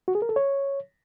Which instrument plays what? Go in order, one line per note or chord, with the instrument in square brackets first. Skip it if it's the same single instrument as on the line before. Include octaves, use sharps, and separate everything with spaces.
[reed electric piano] F#4
G#4
A#4
A4
C#5